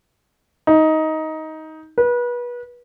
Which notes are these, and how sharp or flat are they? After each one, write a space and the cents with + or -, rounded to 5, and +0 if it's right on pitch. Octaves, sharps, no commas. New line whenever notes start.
D#4 +15
B4 -30